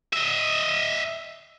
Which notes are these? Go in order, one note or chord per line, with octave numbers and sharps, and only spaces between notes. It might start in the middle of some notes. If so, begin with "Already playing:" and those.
D#5 E5